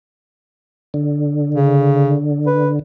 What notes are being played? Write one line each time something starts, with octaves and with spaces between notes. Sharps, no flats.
D3
C#3
B4